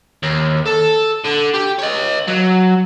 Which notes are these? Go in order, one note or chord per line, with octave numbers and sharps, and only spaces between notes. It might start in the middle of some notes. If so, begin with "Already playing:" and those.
D#2
A4
D3
G4
C#5 D#5
F#3